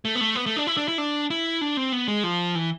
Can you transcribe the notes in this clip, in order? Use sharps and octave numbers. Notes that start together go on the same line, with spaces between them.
A3
B3
A3
B3
A3
D4
E4
D4
E4
D4
E4
D4
C4
B3
G#3
F3
E3